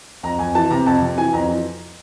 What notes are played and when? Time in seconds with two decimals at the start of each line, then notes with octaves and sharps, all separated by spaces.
0.23 F2 A#5
0.39 F2 G#5
0.55 E3 A5
0.70 C3 A#5
0.86 F2 A5
1.02 C3
1.18 E3 G#5
1.33 F2 A#5
1.49 E3